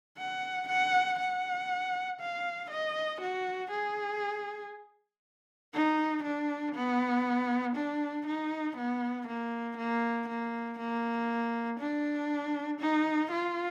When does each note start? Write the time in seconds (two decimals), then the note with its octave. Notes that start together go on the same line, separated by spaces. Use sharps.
0.18 F#5
0.68 F#5
1.19 F#5
2.20 F5
2.70 D#5
3.21 F#4
3.71 G#4
5.73 D#4
6.23 D4
6.75 B3
7.75 D4
8.26 D#4
8.77 B3
9.27 A#3
9.77 A#3
10.28 A#3
10.79 A#3
11.79 D4
12.80 D#4
13.31 F4